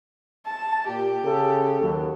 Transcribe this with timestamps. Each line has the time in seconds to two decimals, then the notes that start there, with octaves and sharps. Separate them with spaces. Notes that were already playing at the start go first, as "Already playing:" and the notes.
0.46 A5
0.87 A#2 G4
1.24 C#3 A4
1.81 D#2 F#3